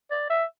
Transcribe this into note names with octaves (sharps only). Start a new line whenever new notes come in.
D5
E5